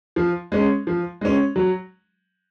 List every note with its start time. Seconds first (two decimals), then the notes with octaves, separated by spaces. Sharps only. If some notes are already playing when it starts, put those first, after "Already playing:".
0.16 F3
0.52 G#3 C#4
0.87 F3
1.21 G#3 C#4
1.56 F#3